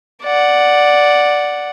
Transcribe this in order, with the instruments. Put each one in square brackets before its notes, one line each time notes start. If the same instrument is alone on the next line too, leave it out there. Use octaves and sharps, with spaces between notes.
[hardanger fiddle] D5 F#5